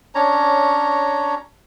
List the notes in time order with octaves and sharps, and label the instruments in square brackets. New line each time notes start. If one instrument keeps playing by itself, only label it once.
[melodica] C#4 D4 C#5 A#5